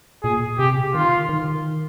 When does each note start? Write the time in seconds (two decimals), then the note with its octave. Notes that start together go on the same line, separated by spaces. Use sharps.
0.23 A#2 G#4
0.58 C3 G4
0.94 D#3 F4
1.29 D#3